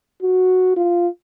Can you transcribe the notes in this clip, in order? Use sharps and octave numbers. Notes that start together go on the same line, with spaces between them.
F#4
F4